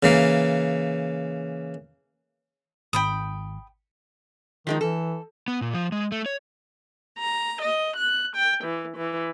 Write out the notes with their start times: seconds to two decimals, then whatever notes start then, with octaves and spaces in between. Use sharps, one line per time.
0.03 C#3 E3 A#3
2.93 G#1 G5 B5 D#6
4.67 D#3 F3 G#3 D#4
4.81 E3 A4
5.48 B3
5.61 A#2
5.74 F3
5.92 G#3
6.12 A3
6.26 C#5
7.17 A#5
7.61 D#5
7.95 F#6
8.34 G5
8.63 E3
8.95 E3